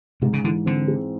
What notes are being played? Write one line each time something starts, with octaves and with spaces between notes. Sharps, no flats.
G#2 C3
C#3
D3 E3
D3 C4
G#3